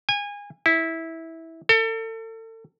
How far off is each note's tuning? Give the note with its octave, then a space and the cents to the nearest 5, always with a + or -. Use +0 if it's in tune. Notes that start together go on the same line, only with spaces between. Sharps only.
G#5 -25
E4 -15
A4 +35